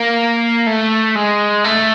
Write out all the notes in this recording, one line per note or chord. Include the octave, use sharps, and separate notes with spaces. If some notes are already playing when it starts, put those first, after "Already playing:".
Already playing: A#3
A3
G#3
A3